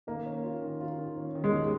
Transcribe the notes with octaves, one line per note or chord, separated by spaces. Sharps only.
D#3 A#3
C#4
F4
D#3
F4
D#3
C#4
D#3
G#3
D#2